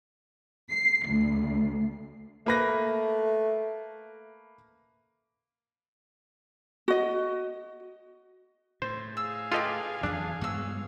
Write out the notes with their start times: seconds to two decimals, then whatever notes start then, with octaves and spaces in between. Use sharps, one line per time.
0.68 C7
1.08 D2
2.46 A3 A#3 B4 A#6
6.88 F#4 D#5
8.82 A2 C5
9.17 G#4 F5 E6
9.52 F4 G4 A4 B4 D#5 D6
10.03 F2 E3 F#3 A3 D4 A5
10.41 G2 G#3 B3 F#4 E6